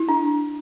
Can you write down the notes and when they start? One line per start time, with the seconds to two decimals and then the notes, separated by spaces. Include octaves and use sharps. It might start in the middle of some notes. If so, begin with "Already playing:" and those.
Already playing: E4
0.09 D4